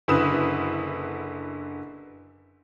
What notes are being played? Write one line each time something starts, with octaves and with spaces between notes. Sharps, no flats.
F#1 D3 E4 B4 D#6 E7